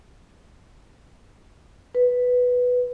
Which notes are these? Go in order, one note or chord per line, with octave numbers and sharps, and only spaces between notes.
B4